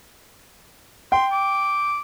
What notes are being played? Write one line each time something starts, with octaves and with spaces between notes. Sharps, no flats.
G5 C6
D6